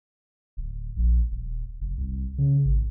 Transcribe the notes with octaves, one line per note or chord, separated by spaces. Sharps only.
D1
A#1
D#1
F1
C2
C#3
G#1